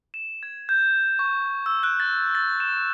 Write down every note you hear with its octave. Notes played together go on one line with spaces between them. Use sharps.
E7
G#6
G6
C#6
E6
F#6
A6
A6
E7